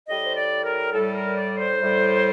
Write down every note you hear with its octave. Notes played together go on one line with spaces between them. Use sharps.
A2 G3 D#5
C5
D5
A#4
A2 G3 A4
A#4
D5
C5
A2 G3